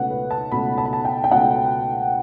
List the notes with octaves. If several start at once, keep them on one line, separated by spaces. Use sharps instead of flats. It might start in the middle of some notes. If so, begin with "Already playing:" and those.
Already playing: C#2 B2 A3 C#4 B4 F#5
B4
A5
C#2 B2 A3 C#4 B5
A5
B5
A5
G5
G5
C#2 B2 A3 C#4 F#5